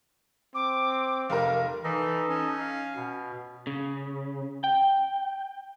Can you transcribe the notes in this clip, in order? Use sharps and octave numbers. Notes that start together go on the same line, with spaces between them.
C4 D6
F1 A#4 F5
E3 D#4 A4 D#5
C#4
F5
B2
C#3
G5